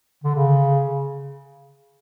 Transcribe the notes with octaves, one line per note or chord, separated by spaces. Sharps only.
D3
C#3